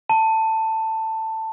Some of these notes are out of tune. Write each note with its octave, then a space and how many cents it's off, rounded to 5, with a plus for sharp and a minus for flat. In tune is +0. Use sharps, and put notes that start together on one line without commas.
A5 +15